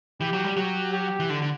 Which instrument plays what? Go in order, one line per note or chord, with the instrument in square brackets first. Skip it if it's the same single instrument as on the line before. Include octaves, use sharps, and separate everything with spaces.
[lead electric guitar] E3 [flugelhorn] G4
[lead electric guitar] F#3
G3
[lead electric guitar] F#3 [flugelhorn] G4
[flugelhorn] G4
[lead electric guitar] E3
D3
D3